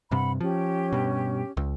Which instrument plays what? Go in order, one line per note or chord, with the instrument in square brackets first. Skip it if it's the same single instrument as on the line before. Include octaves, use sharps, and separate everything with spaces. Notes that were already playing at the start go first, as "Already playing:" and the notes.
[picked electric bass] G2 C3 [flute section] F#5 B5
[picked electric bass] F3 [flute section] C#4 G4
[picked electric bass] G2 B2
C#2